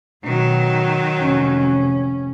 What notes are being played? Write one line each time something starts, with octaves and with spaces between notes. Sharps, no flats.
B2 D#3 F#3
F1 C#4